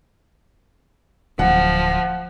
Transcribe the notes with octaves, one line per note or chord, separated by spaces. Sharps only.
D1 F3 F#5